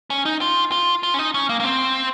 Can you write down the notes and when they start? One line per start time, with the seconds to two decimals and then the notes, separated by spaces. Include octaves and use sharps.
0.10 C#4
0.25 D#4
0.41 F4
0.72 F4
1.03 F4
1.14 C#4
1.19 D#4
1.34 C#4
1.49 A#3
1.60 A#3
1.64 C4